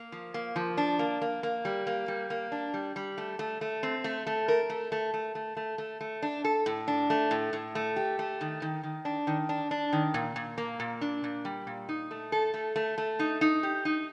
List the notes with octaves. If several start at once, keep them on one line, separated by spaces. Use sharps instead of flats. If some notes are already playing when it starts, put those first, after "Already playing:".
Already playing: A#3
F3
A#3
F3
D4
A#3
A#3
A#3
G3
A#3
G3
A#3
D4
G3
G3
A3
A3
A3
C4
A3
A3
A#4
A3
A3
A3
A3
A3
A3
A3
D4
A4
A2
D4
A3
A2
A2
A3
G4
A3
D#3
D#3
D#3
D4
D#3
D4
D4
D#3
A#2
A#2
A#3
A#2
D4
A#2
G3
A#2
D#4
A3
A4
A3
A3
A3
D#4
D#4
G4
D#4